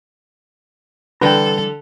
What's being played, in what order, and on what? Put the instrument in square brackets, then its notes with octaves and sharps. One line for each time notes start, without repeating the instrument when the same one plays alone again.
[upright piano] D3 [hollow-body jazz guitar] E3 G3 A#5 [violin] A4 [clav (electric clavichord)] B4 G5